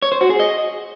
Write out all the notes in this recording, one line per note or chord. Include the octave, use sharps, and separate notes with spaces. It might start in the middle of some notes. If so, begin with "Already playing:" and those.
C#5
C5
F#4
G#4
D#5